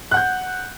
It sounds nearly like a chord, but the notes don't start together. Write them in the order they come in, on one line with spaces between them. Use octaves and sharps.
F#6 F#5 G6